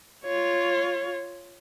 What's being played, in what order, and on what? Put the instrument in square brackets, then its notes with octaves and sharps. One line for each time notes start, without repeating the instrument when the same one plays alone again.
[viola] F4 C#5